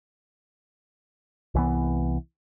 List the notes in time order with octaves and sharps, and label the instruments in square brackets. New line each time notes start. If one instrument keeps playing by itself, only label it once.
[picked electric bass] C2 E3 B3